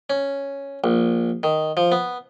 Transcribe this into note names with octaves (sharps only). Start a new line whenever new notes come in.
C#4
A#1
D#3
F3
B3